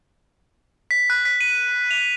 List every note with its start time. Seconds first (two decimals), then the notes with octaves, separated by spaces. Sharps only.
0.91 B6
1.10 F#6
1.25 B6
1.41 D#7
1.91 F7